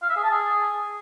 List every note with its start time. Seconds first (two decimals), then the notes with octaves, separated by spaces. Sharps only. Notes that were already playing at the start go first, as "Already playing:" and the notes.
0.03 F5
0.09 E5
0.16 G#4
0.23 A5
0.30 G#4